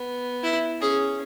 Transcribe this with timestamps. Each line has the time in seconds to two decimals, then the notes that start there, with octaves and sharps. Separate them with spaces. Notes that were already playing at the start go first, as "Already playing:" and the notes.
Already playing: B3
0.43 E4
0.81 C#4 G#4